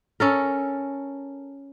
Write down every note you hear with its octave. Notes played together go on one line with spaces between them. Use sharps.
C#4 A4 A#4